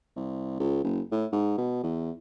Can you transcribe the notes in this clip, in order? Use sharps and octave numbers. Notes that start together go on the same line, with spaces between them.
C2
C#2
F#1
A2
G#2
B2
E2